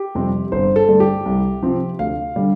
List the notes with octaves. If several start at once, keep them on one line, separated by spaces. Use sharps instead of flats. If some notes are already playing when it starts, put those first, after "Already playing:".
Already playing: G4
F2 C3 G3 C4
G1 C5
A4
G2 D3 A3
G4
C2
C3 F3 C4
D2 F5
D3 G3